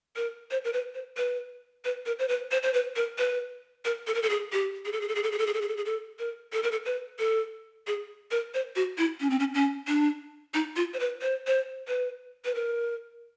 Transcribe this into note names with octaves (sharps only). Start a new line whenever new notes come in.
A#4
C5
A#4
B4
C5
B4
B4
A#4
C5
B4
C5
C5
B4
A#4
B4
A#4
A4
A#4
A4
G#4
G4
G#4
A4
G#4
A4
G#4
A4
G#4
A4
G#4
A4
G#4
A4
G#4
A4
A#4
A4
A#4
A4
B4
A4
G#4
A#4
C5
F#4
E4
C#4
C4
C#4
C#4
D4
D#4
F4
C5
B4
C5
C5
B4
B4
A#4